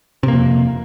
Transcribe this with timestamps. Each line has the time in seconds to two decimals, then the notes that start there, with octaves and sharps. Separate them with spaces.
0.23 C3
0.28 A#3
0.33 F2